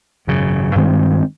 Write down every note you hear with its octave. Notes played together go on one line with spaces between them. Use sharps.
G#1 F#2 C#3
G2 D#3 G#3 C4